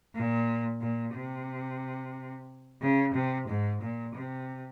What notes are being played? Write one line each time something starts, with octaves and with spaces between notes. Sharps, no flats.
A#2
A#2
C3
C#3
C3
G#2
A#2
C3